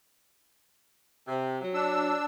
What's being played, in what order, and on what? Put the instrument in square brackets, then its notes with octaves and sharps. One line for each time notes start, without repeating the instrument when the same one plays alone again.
[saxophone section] C3
F#3
[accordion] D4 E6